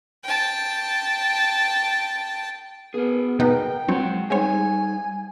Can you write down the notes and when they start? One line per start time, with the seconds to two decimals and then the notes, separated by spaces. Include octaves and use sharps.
0.24 G5 A5
2.94 B3 G#4 A#4
3.39 B2 B3 D#4 G5
3.88 F#3 G#3 C4 C#5 F#5
4.30 G3 G#3 C4 D#4 C#5 G#5